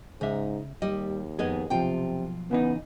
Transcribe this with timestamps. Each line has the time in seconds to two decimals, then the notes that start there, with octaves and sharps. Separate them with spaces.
0.21 G#2 C#3 D#4 E5
0.82 D#2 G3 D#5
1.39 F2 B3 D#4 G#4 D#5
1.70 B1 C3 F3 F4 G5
2.51 C#3 E3 B3 D#4